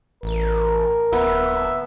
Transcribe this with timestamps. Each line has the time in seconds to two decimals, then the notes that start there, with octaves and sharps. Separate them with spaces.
0.23 A1 A#4
1.13 D1 B3 E5